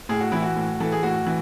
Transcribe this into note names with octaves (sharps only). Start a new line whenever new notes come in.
A2 G#4
F#4
E3 E4
F#4
A2
E3 A4
G#4
A2 F#4
E3